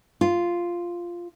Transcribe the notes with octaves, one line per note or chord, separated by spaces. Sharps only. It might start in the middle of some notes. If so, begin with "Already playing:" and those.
F4